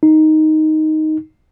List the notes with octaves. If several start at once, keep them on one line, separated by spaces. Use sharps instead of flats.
D#4